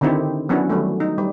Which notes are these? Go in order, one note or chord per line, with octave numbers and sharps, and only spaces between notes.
D3 D#3 C4 D#4 E4 G4
F#3 B3 C#4 D4 E4 F#4
D#3 F#3 G3 A3
D#4
G3